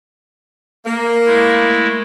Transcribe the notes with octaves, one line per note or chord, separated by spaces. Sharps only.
A#3
G#3 A3 E4